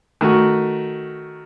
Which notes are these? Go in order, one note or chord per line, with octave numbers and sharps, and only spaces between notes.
D#3 A3 F#4